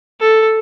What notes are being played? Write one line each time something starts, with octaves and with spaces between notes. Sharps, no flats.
A4